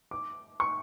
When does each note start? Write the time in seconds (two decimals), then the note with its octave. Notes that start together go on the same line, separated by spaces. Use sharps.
0.11 D6
0.60 C#6